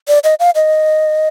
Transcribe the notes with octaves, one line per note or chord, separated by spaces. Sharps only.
D5
D#5
F5
D#5